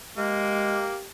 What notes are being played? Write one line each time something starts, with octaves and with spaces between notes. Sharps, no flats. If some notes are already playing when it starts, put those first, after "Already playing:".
G#3 A#3 G4